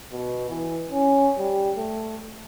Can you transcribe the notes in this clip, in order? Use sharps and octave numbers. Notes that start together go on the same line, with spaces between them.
B2
E3
C#4
G3
A3